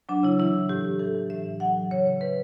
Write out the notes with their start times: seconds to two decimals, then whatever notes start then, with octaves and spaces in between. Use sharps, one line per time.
0.09 F#3 D4
0.23 C#3 E4
0.39 E3 E4
0.54 E3
0.69 A2 G4
0.85 A2
0.99 E3 A4
1.15 E3
1.30 A2 E5
1.46 E3
1.60 F#3 F#5
1.75 F#3
1.91 C#3 C#5
2.07 C#3
2.21 E3 B4